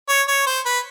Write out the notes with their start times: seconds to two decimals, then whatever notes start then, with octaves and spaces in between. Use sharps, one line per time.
0.09 C#5
0.28 C#5
0.47 C5
0.66 B4